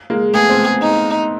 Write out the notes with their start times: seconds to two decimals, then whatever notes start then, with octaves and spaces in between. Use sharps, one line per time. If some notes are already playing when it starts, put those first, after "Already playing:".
0.10 G#3 A#3
0.34 A3 B3 G#4
0.50 C4
0.58 A3 B3
0.82 D#4